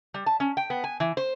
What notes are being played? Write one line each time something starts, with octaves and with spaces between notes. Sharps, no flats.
G3
A5
C#4
G5
B3
G#5
E3
C5